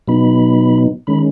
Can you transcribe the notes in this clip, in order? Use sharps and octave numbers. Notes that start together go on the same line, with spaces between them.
B2 F#3 B3 D#4 B5
D#3 G#3 C#4 B5